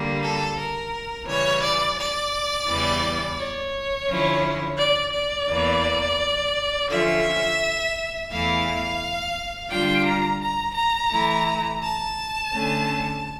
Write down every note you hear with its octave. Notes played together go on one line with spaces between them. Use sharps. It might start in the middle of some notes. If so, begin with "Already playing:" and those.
Already playing: D3 G3 A#3
A4
A#4
C#3 E3 G3 C#5
D5
D5
E2 C#3 E3 G3
C#5
D3 F3 C#4 E4
D5
D5
E2 E3 A#3
D3 F3 C#4 F4 E5
E2 E3 A3 E4 F5
D3 G3 D4 F4 G5
A#5
A#5
A#5
E3 A3 E4
A5
D3 A3 C#4